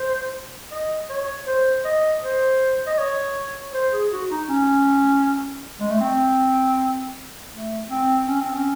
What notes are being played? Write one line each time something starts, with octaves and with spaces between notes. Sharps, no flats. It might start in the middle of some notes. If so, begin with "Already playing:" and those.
Already playing: C5
D#5
C#5
C5
D#5
C5
D#5
C#5
C5
G#4
F#4
D#4
C#4
G#3
A3
C4
A3
C4
C#4
C4
C#4